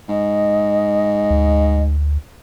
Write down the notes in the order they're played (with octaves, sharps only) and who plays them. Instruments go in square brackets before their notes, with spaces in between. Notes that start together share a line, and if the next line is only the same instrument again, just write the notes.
[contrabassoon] G#2 [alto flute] D#5
[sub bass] D2